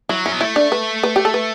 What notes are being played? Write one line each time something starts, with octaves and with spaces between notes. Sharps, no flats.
F#3 E4
C#4 E4
B3
A3 E4
D4
B4
B4
G4
A4
B4